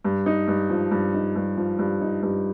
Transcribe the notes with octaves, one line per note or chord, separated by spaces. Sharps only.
G2
D#4
G2
F3
G2
D#4
G2
F3
G2
D#4
G2